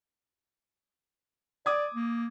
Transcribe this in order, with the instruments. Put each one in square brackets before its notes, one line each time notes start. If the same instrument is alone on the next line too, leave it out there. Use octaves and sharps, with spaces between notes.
[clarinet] D5 [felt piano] D6 D#6 G#6
[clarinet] A#3